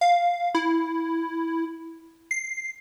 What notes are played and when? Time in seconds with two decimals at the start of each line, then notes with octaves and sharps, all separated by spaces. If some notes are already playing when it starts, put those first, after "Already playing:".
0.01 F5
0.55 E4
2.31 C7